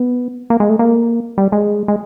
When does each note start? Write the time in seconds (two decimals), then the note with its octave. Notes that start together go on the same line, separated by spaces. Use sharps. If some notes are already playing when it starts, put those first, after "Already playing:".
Already playing: B3
0.50 A#3
0.60 G#3
0.69 A3
0.79 A#3
1.38 G3
1.52 G#3
1.88 G#3